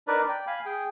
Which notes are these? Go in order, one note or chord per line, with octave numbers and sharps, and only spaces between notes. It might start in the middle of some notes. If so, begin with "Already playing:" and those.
D4 D#4 A#4 B4 D5
D5 G5
F5 G#5 B5
G#4 G5